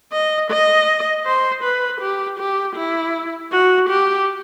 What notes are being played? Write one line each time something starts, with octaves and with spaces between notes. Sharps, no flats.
D#5
D#5
C5
B4
G4
G4
E4
F#4
G4